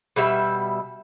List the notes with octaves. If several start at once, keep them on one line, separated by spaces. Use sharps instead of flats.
B2 G3 E5